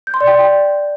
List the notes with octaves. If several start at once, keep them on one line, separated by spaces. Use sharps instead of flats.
G6
C6
D5
G5